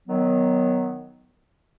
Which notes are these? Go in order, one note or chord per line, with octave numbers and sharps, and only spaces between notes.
D#3 F#3 B3